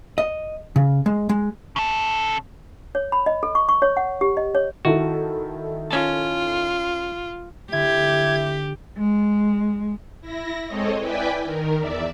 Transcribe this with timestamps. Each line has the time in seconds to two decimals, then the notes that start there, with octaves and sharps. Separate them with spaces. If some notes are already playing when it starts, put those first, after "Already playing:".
0.18 D#5
0.76 C#3
1.06 G#3
1.29 G#3
1.76 C#3 A4
2.95 C#5
3.12 B5
3.26 D#5
3.43 A4
3.55 C#6
3.69 C#6
3.82 C#5
3.97 F#5
4.21 G4
4.37 D#5
4.55 C#5
4.85 D#3 E4 F#4 A4
5.91 C#4 F4 A5
7.72 D3 E4 G4 G#6
8.98 G#3
10.21 E4 A#6
10.67 G#3 C4 A4 C#5 D#5
10.99 E4 B4 D5 G5 G#5 B5
11.43 D#3 A#4
11.79 E2 D5 E5